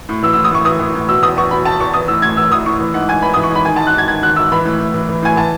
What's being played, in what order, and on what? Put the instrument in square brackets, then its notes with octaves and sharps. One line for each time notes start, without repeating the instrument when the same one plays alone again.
[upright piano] A2
E3 E6
E6
A2
D#6
A2 C#6
E3 D#6
E3
A2
B2 E6
E2 D#6
E2 C#6
B2 B5
B2 A5
E2 C#6
E3 D#6
A2 E6
A2 G#6
E3 E6
E3 D#6
A2 C#6
E3
G#2 F#5
G#2 G#5
E3 B5
D#6
E3
C#6
G#2 B5
D#3 G#5
A5
G#2
F#6
G#2 G#6
D#3 G#6
D#3 F#6
G#2 E6
E3 B5
A2
A2
E3
E3
A2 G#5
E3 A5